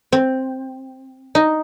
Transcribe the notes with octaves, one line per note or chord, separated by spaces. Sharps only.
C4
D#4